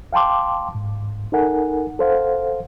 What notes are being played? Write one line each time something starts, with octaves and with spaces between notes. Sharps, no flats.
F5 G5 A5 C6 D6
G#2
D#4 A4 A#4 F#5 G#5
A4 C5 F5 F#5